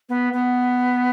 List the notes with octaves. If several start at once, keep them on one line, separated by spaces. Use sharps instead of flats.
B3
B3